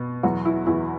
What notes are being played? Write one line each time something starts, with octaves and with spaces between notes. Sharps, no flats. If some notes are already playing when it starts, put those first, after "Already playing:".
Already playing: B2
E2 F#3 F#4
E4
E2 E4